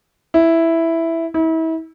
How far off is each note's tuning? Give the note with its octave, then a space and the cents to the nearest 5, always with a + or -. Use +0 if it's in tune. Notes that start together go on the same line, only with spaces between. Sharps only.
E4 +0
E4 -35